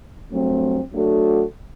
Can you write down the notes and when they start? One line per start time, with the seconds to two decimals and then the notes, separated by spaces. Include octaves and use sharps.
0.31 G2 F#3 A3 C4
0.93 F#3 A3 D4 F#4 A4